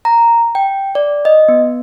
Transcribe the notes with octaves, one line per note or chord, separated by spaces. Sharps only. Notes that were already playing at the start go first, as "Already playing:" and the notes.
A#5
G5
D5
D#5
B3